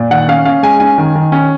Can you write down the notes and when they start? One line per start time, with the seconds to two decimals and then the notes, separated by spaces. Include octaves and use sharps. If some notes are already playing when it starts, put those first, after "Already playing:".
Already playing: A#2
0.11 D#3 F#5
0.28 C#4 F5
0.45 C#4 F5
0.63 G#3 G#5
0.80 C#4 G#5
0.98 D#3
1.15 D#3
1.32 C#4